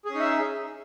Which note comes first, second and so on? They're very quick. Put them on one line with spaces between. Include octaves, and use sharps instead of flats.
G#4 C#4 D#4 E5